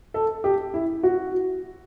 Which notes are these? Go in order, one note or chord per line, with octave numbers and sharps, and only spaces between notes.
A4
G4
E4
F#4